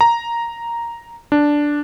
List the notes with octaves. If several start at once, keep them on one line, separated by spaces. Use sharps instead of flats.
A#5
D4